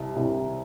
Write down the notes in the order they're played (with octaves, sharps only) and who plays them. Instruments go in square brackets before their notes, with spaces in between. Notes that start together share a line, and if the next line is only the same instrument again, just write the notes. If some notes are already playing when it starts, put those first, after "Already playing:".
Already playing: [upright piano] C2 C3
C2